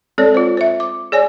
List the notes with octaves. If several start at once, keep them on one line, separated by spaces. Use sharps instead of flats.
G#3 C4 A4 C#5 D5
F4 C5
C5 E5
D6
G#4 C#5 D5 G#5